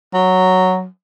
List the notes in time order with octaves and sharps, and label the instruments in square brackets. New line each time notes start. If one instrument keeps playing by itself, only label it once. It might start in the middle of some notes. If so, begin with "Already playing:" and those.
[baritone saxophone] F#3